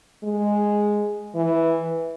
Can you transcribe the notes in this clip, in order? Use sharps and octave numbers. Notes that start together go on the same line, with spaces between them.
G#3
E3